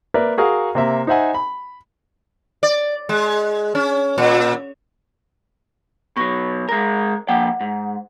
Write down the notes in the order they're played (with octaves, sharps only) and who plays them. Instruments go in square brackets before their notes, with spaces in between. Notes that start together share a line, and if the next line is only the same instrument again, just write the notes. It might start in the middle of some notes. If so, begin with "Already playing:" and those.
[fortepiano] A#3 A#4 B4 D5 E5
F#4 G#4 A#4 F5 F#5
C3 A#3 E5
D#4 C5 E5 F#5 G#5
B5
[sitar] D5
G#3
C#4
A#2
[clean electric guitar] B2 F#3 [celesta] C#6 A#6
[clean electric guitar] G#3 A#4 [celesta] A#6
[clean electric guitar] F3 A#3 G5 [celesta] F#5
[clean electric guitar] G#2